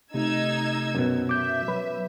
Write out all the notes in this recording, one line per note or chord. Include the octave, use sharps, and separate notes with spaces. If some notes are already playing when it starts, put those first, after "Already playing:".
C3 A3 D#4 E6 G#6
F#2 B2
E5 D6 G6
F#3 B4